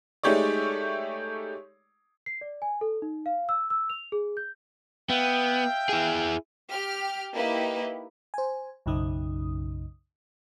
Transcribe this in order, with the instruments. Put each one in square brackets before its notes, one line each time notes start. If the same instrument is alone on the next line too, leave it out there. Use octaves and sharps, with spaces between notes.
[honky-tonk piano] G#3 A3 D#4 G4 C#5 D5
[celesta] C7
D5
G#5
A4
D#4
F5
E6
E6
F7
G#4
G6
[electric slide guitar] B3 [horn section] E5 F5 G5
[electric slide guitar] E4 G#4
[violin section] G4 F6
A#3 D#4 E4 G4 B4
[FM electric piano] C5 G#5
B1 F#2 C#3 D#4 D#6